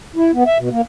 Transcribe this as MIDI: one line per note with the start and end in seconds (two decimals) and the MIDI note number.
0.16 0.31 64
0.33 0.44 59
0.46 0.58 76
0.58 0.69 47
0.71 0.81 58